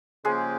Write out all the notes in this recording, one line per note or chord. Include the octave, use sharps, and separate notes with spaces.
C#3 F3 G#3 A#3 C#4 G4 G#4